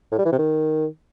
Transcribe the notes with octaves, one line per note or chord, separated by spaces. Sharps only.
A2
G3
E3
C3
D#3